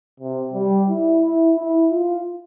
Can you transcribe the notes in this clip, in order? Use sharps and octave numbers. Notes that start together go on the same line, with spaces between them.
C3
G3
E4
E4
E4
F4